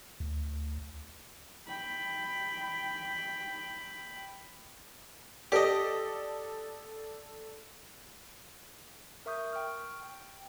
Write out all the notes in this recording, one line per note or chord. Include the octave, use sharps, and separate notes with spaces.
D2
G5 B5
G4 A4 D5 D#5
A#4 E5 C#6 D#6 G6
G5 C#6 F6
G5